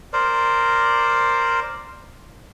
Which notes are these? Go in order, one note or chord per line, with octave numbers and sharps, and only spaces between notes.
A#4 C5 D5